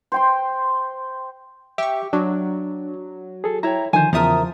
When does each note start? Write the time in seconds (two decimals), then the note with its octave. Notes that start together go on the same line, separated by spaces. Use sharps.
0.12 C5 G5 C6
1.78 G4 E5 C#6
2.13 F#3 D4
3.44 G#4 A4
3.63 E4 C#5 G5 A#5
3.93 D3 D#3 F3 C5 G#5
4.13 E2 C#3 F3 A#4 E5 A5 A#5 D#6